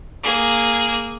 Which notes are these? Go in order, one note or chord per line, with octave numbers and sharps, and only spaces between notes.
A#3 G#4